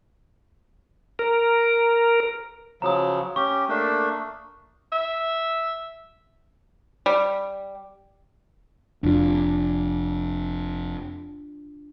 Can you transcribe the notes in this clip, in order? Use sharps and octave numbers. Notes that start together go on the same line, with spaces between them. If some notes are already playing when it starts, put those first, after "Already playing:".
A#4
C#3 F3 F#3 A#5 D#6
C#4 G4 C#6
A3 A#3 D4
E5
G3
F1 F2 D4 F4